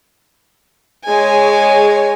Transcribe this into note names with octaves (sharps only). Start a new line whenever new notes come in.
G#3 G#4 C#5 G#5